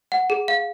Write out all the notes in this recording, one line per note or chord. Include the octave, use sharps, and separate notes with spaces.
F#5
G#4
F5